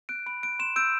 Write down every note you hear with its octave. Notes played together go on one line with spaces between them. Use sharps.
F#6 D7
B5 D7
F#6 D7
C6 E7
E6 G6 D7